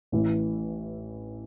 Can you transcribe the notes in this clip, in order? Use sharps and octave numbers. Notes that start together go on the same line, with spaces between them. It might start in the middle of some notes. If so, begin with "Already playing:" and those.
A1 A2 E3